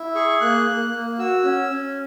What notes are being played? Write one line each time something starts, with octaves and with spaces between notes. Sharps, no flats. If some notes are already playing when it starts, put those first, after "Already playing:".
Already playing: E4
G#4 C#6
A#3 F#6
A#3
A#3
F#4 E6
C#4
C#4